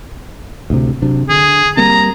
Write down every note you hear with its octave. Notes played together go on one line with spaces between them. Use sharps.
D2 A2 C3
C3 F#3 D4
D3 G#4
G3 A#3 C4 A#5